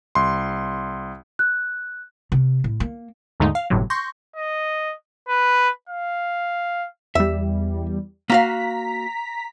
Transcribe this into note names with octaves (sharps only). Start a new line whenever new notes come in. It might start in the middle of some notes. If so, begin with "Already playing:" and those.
C2 C6
F#6
C3
A2
A#3
D#2 G#2 D3 G#3 A3 D#4
F5
G1 A2 C3 F#3
C6 C#6 G6 A#6
D#5
B4
F5
E2 G3 E5
A#3 F#4 F5 A#5 B6